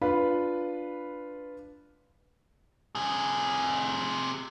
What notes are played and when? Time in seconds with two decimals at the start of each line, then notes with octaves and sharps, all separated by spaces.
0.01 D4 F4 B4 B5
2.95 C3 G#4